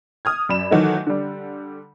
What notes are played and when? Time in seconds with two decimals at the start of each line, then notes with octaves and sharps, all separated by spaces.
0.25 D#6 F6 G#6
0.49 F#2 D5 B5 E7
0.70 D#3 E3 F#3 A3 D#4
1.06 D3 G3